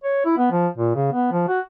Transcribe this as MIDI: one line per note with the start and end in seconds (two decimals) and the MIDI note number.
0.04 0.21 73
0.25 0.34 64
0.37 0.47 59
0.52 0.68 53
0.78 0.92 46
0.95 1.09 49
1.12 1.32 59
1.32 1.46 53
1.48 1.60 66